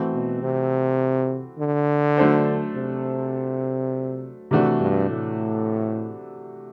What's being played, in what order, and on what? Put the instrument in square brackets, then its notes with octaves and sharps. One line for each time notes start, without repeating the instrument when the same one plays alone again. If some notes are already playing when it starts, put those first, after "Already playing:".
Already playing: [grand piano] E3 A3 C4 F#4
[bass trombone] B2
C3
D3
[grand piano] F#3 A3 D4 A4 C5
[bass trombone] C3
[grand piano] C3 E3 A3 D4 F#4
[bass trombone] G2
A2